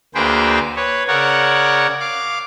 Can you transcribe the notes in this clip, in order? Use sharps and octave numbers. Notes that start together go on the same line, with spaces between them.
D2 A#3 G#4 B4 C5 G5
B4 C#5
C#3 A#4 C#5 D5 F#5
F5 D6